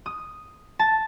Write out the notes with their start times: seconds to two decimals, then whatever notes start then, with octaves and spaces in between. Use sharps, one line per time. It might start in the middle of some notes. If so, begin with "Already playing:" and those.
0.06 D#6
0.79 A5